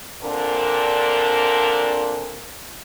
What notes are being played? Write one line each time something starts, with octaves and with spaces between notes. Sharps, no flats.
A#2 D3 C4 D4 A#4